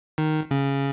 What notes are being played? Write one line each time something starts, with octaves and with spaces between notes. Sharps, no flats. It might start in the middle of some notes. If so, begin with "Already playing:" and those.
D#3
C#3